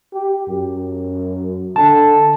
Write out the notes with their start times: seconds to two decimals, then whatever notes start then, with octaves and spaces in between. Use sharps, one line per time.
0.13 G4
0.47 F#2
1.76 D3 A5